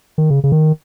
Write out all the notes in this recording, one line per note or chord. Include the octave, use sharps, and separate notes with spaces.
D#3
C#3
C#3
D#3